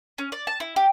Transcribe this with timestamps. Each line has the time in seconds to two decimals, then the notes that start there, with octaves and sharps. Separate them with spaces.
0.18 C#4
0.32 D5
0.47 A5
0.60 E4
0.76 G4